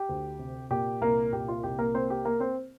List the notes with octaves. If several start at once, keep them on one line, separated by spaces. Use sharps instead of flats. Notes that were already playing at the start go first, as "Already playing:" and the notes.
Already playing: G4
D2
C3
A#2 G4
C2 A#3 A#4
A#2 G4
F4
C2 G4
A#3 A#4
A#3 C4 C5
G4
A#3 A#4
C4 C5